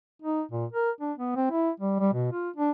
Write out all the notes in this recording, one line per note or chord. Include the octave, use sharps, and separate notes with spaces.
D#4
A#2
A#4
D4
B3
C4
E4
G3
G3
B2
F4
D4